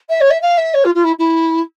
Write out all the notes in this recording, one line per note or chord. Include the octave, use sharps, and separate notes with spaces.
E5
C#5
E5
F5
E5
C#5
F4
F4
E4
E4